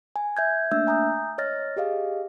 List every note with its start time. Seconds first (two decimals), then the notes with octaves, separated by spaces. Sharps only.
0.16 G#5
0.37 E5 G6 G#6
0.72 A3 A#3 D4 E5 E6 G6
0.87 G#5 A#5 D#6 G6
1.38 C#5 D#5 F6 A6 A#6
1.76 G4 G#4 D#5 F5